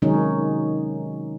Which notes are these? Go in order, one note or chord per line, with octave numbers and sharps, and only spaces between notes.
C3 D#3 F#3 G#3 C#4 D#4